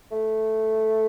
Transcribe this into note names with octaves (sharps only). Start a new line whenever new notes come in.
A3